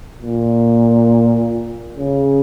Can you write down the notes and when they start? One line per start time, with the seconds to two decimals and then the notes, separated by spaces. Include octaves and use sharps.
0.22 A#2
1.97 C#3